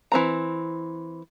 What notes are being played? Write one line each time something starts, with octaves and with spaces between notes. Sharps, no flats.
E3 C4 A#5